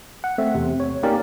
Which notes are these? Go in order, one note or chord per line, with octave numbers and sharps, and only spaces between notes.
F#5
A3 C4 E5
E2 C3
C#5
A#3 C#4 D#4 G4 A#4 D5